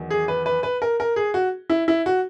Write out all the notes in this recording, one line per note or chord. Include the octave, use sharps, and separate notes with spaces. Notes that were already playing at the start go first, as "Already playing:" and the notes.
Already playing: E2 D#3 F#3
G#4
B4
B4
B4
A#4
A#4
G#4
F#4
E4
E4
F#4